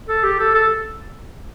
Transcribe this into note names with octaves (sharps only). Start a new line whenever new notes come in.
A4
G4
A4
A4